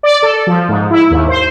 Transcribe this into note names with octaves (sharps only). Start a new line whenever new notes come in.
D5
A4
F3
G#2
E4
D#2
C5